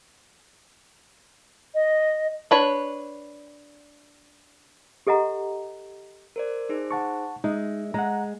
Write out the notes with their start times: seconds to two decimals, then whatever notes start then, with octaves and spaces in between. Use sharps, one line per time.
1.75 D#5
2.51 D4 B4 C#5
5.07 G4 A4 D#5 F#5 A#5
6.36 A#4 C5 D5
6.69 D#4 G#4 C5
6.91 F#5 A5 C#6
7.44 G#3 D#4 E5
7.94 G#3 F#5 A#5